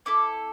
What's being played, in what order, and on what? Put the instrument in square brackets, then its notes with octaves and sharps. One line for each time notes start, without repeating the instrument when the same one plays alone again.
[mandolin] C4 E4 A4 D6